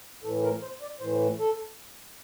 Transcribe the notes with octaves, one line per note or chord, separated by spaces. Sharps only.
A2 E3 A4
A#4
C5
D5
A2 E3 C5
A4